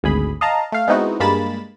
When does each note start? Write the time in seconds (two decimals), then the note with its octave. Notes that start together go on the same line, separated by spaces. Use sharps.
0.03 G#1 D2 G#4 B5
0.41 D#5 F5 A5 A#5
0.72 A3 F5
0.87 G#3 B3 C4 D#4 E4 F#4
1.20 G2 G#3 A#3 B5 A6 E7